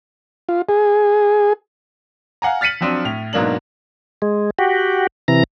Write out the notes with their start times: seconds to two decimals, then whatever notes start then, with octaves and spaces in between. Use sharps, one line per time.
0.49 F4
0.69 G#4
2.42 F5 F#5 G#5 A#5
2.61 F6 A6 B6 C#7 D#7 F#7
2.81 F3 F#3 C4 D4
3.05 A2 F7
3.33 G#2 B2 F#3 A#3 D4 F#7
4.22 G#3
4.59 F#4 G4
5.28 C3 E3 A#5